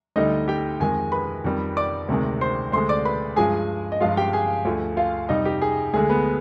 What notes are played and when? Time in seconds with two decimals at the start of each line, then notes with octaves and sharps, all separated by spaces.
0.16 D2 D3 G3 D#4 D#5
0.48 G4 G5
0.80 F2 D#3 G#3 G#4 G#5
1.12 B4 B5
1.44 F2 D#3 G3
1.77 D5 D6
2.08 D2 C3 D#3 G#3
2.41 C5 C6
2.72 D2 D3 G#3 C5 C6
2.89 D5 D6
3.05 B4 B5
3.36 G2 F3 G#3 G#4 G#5
3.92 D#5
4.00 G2 F3 G#3 F4 F5
4.17 G4 G5
4.33 G#4 G#5
4.65 D2 D3 F3
4.97 F4 F5
5.29 F2 C3 G3 D#4 D#5
5.45 G4
5.62 G#4
5.93 D2 D3 G#3 G#4
6.10 B3 B4